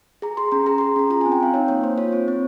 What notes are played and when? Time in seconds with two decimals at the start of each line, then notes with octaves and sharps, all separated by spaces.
0.22 G#4 A#5
0.37 G#4 C6
0.52 C#4 A#5
0.66 G#4 A#5
0.78 G#4 C6
0.96 C#4 A#5
1.10 F4 A#5
1.21 C4 G#5
1.32 G5
1.40 C4 F5
1.54 D#4 C#5
1.68 A#3 C#5
1.83 A#3 C5
1.98 F4 C#5
2.13 C4
2.28 C4